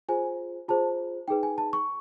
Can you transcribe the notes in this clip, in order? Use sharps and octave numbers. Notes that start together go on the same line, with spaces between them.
F4 G#4 C5 G#5
F4 G#4 C5 A5
D#4 G#4 B4 G5
G#5
A5
C#6